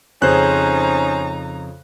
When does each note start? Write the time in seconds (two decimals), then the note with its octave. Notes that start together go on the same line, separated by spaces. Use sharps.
0.22 F2 C#3 C#4 D#4 G#4 C5 A#5 F#6